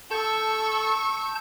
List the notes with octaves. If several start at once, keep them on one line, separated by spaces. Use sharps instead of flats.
A4 A5 C#6 E6 G6